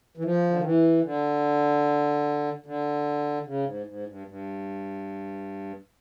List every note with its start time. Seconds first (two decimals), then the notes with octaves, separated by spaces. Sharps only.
0.17 E3
0.25 F3
0.50 D3
0.57 D#3
0.64 E3
1.05 D3
2.66 D3
3.46 C#3
3.66 G#2
3.86 G#2
4.07 G2
4.27 G2